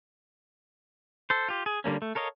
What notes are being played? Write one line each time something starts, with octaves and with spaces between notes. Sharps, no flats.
A4 C5
F4 G4
G#4
D3 G3 A#3 C#4
A3
A4 A#4 C#5 D#5 F5